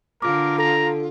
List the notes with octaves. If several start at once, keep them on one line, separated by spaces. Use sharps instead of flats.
D3 F4 A#4 D6
A4 A#5